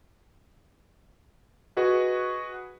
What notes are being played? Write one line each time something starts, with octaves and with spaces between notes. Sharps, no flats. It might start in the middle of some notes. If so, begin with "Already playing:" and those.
F#4 G#4 B4 D#5